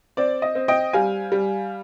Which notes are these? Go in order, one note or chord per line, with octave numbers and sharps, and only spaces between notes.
C4 D5
D#5
C4
D#5 G5
G3 F5 G#5
G3